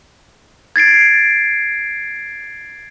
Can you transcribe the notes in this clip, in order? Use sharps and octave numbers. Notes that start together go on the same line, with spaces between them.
G#6 A6 C7 D7